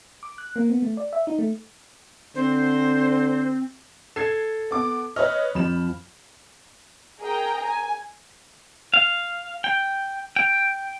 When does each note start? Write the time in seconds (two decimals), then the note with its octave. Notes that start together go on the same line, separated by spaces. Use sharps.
0.23 D6
0.38 F#6
0.56 A#3
0.70 B3
0.82 A3
0.97 D5
1.13 E5
1.27 D#4
1.39 A3
2.35 D3 C4 C5
4.16 A4 G#6 C7 E7
4.71 B3 D6
5.16 B4 C#5 D#5 F6
5.55 F2 F3 B5 E7
7.20 G#4 A#4 G5 A#5
7.64 G#5
8.94 F5
9.64 G5
10.36 G5